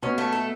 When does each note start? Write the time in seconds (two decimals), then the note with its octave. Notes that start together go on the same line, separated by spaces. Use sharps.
0.03 B2 C#4
0.18 A3
0.33 A4